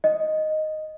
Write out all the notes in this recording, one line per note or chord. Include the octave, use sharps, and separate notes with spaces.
D#5